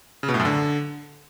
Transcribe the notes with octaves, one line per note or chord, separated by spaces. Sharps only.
C#3
B2
A2
F#2
D3